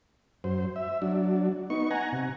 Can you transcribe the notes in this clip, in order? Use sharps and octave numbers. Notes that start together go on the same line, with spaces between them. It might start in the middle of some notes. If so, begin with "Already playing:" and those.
F#2 C5
E5
F#3 D4
B3 D#4 C#6
F#5 G#5 A#5
C3